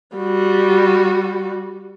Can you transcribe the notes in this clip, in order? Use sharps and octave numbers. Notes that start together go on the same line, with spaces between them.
G3 F#4